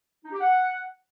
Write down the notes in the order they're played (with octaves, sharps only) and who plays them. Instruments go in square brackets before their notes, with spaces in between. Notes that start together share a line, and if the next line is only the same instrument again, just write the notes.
[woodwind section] D#4
G4
F#5